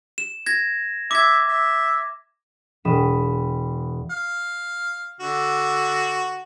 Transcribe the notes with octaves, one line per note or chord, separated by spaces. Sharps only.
E7
G#6 A#6
E5 D6 G#6
E5
E1 B5 D#6 E7
F5
D3 F#4